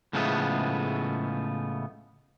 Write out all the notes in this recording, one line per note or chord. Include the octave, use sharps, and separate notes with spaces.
A2 C#3 F3 G#3 A3 B3